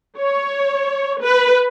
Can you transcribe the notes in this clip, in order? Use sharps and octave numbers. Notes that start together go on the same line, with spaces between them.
C#5
B4